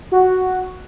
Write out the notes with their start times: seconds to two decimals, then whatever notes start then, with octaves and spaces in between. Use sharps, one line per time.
0.12 F#4